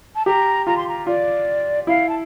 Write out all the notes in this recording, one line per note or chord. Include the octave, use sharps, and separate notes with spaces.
A5
G4 A#5
F4 A#5
C6
A#5
F4 D5
E4 F5
A5